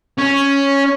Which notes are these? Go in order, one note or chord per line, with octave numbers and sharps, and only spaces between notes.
C#4